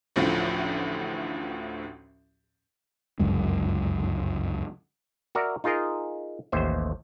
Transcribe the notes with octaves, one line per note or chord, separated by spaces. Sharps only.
A1 D2 A2 F3
G1 C#2 F#2 G#3
F#4 A#4 D5 E5
D#4 F4 G#4 A#4 D#5
A1 D#2 C5 E5